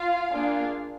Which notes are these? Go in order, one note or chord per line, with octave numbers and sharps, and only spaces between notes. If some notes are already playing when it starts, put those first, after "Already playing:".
Already playing: F4 F5
A#3 D4 F4 G#4